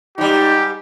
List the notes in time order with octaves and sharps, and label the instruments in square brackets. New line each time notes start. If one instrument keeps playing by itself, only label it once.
[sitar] G#2 G3 [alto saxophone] D#4 [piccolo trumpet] G4